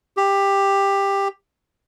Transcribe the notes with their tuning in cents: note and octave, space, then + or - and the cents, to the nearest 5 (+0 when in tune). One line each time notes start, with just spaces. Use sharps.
G4 +15